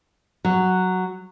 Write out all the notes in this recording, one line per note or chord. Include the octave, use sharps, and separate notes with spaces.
F#3